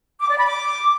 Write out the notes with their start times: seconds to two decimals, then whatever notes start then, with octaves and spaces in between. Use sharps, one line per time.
0.19 D6
0.28 D5
0.37 B5
0.46 D6